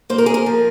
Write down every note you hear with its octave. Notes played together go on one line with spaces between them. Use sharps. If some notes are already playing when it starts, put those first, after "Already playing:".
A#3 C5
A#4
G#4
A#4
F3